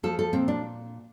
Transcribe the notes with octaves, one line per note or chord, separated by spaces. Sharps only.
F3 A4
A4
A#2 C4
D4